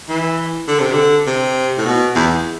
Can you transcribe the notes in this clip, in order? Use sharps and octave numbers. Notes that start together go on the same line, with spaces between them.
E3
D3
C3
D3
C3
A2
B2
E2